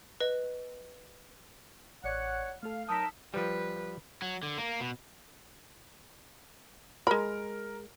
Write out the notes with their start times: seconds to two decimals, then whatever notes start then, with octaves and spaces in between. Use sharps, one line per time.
0.20 B4 D#5
2.04 A1 C#5 D5 F#5 C#7
2.63 A3 A4 F5
2.89 F#3 D#4 A#4 A5 D#6 E6 B6
3.34 F3 G3 B4
4.22 F#3
4.43 D3
4.58 A#3
4.80 B2
7.07 G#3 A#4 B5